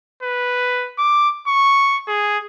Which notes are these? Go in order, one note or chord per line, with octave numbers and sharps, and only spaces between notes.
B4
D6
C#6
G#4